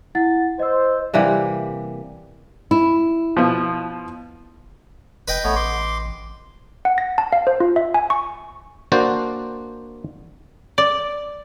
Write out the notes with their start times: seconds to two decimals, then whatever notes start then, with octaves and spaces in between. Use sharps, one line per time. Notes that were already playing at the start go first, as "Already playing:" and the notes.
0.15 E4 F#5 A6
0.59 C5 D#5 E6
1.14 C3 E3 G3 A#3
2.71 E4
3.37 B2 F3
5.28 F1 B4 D#5 G5
5.44 A1 A3 B3 C#5
5.56 C6 D6
6.85 F#5
6.98 A#6
7.18 A5
7.33 F5
7.47 C5
7.60 F4
7.76 E5
7.94 G#5
8.10 C#6
8.92 A#3 D4 F#4 C5 A5
10.78 D5